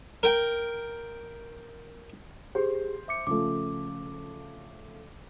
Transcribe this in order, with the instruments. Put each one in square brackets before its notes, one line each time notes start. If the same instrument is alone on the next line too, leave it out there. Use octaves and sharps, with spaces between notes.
[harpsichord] A#4 G5
[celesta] G4 G#4 [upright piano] C5
[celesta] E5 D6 C#7
[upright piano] C#3 F3 A3 [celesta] D6